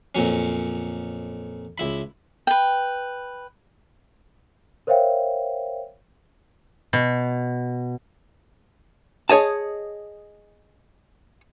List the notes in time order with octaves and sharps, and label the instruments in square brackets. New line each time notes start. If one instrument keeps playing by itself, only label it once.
[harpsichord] F2 A#2 F#3 C#4
C#2 E4 B5
[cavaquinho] B4 G5
[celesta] A#4 C5 C#5 E5 F5 G5
[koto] B2
[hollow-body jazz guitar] G#4 C#5 D#5 A5